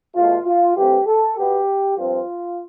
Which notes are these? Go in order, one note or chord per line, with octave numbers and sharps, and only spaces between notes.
E2 B2 A3 F4
F4
G2 E3 A3 C4 G4
A4
B2 B3 G4
G2 F3 C4 F4